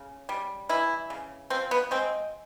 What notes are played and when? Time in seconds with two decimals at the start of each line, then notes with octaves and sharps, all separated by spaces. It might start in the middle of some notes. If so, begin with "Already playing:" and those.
Already playing: C#3
0.29 G3
0.69 E3 E4
1.10 C#3
1.50 F3 C4
1.71 B3
1.91 G#3 C4